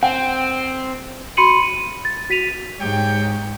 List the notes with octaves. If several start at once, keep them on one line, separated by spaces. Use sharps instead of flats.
C4 G5
F#4 B5 C6 C#7 D#7 F#7
D#7
A6
F#4 B6 D#7 F7
G#2 G4 C#5 G5